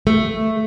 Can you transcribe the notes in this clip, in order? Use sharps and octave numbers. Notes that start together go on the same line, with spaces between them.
A3